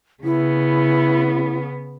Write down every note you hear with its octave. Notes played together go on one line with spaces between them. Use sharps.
C#3 B3 E4